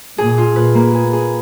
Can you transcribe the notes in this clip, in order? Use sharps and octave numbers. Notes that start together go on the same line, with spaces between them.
A#2 G#4
F4
B4
A#3
G#4
G#4